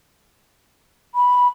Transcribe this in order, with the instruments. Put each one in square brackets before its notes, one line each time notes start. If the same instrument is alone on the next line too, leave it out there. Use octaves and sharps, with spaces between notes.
[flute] B5